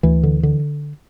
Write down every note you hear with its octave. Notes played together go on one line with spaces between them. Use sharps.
D2 E3
D3
D3